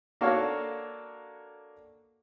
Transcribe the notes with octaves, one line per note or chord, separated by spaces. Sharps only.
A#3 D4 F#4 A4 C#5 F5